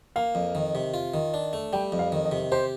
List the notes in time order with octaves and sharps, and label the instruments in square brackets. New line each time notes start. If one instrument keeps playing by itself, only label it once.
[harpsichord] A#3 [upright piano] F5
[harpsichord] F2
D#3
C3
F4
D#3
D4
A3
[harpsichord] G3 [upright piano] G5
[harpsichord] F2
[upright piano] F5
[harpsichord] D#3
[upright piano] D#5
[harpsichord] C3
[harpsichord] G4 [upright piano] C5